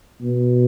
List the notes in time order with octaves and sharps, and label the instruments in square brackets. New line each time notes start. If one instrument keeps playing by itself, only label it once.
[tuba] B2